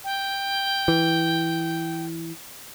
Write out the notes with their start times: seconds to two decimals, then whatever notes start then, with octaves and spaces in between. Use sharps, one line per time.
0.04 G5
0.88 E3